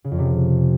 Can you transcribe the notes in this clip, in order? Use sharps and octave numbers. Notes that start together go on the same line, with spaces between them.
C#3
F2
C3